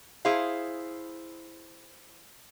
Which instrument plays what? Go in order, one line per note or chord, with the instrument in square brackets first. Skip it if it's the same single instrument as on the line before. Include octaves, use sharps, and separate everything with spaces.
[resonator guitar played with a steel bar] E4 G#4 C5 F5